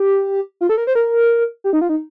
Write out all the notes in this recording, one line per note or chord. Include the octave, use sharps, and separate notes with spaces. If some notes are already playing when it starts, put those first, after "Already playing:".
Already playing: G4
F4
A4
A#4
C5
A#4
G4
D#4
F4
D#4